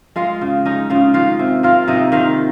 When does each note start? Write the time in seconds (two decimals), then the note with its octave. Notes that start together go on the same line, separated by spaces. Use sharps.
0.16 G#3 F4 F5
0.41 C#3
0.65 C#4 D#4 D#5
0.90 C#3 F4 F5
1.14 D#3 F4 F5
1.39 C3
1.63 A#3 F4 F5
1.88 C3 D#4 D#5
2.12 D#3 F4 F5